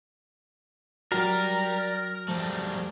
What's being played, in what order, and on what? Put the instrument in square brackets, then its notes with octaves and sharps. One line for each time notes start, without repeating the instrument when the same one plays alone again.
[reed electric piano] F#3 F#4 [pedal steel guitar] A#4 [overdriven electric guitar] D5 G5
[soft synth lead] F3 [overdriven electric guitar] G3 A3